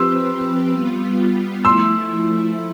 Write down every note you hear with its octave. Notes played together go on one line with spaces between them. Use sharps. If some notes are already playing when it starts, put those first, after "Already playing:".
Already playing: F3 C4 G4 B4 C6 E6
G3 B3 F4
F3 A3 E4 C6 E6